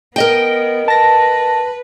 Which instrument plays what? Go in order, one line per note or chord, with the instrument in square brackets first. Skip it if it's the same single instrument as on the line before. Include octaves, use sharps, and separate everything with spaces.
[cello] B3 [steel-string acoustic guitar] A#4 D#5 G5
[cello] B4 [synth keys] A5 A#6